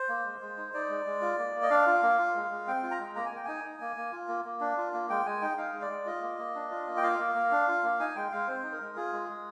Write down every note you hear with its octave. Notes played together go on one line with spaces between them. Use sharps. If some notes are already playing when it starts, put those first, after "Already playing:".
Already playing: C5
A#3
G#3
G#3
D#4
D#4 D5
G#3
G#3
F4
A#3
A#3
D#5
D4 F5
F4
A#3
F4
G#3
G#3
C4 G5
F4
A#5
G#3
A#3 A#5
G#5
A#3 G5
D#4 G#5
D#4
A#3
A#3
F4
A#3
A#3
D4
F4
A#3
G#3 G5
G#3 G#5
D#4 G5
D#4 F5
G#3
D5
G#3
F4 D#5
A#3
A#3
D4
F4
A#3
G5
F4 F5
A#3
A#3
D4
F4
A#3
D#4 G#5
G#3 G5
G#3 F5
C4 C5
D#4
A#4
G#3
F4 G#4
G#3
G#3